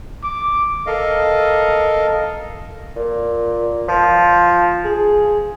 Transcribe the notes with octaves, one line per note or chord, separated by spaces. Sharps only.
D6
A4 A#4 D#5 F5
A#2
F3
G#4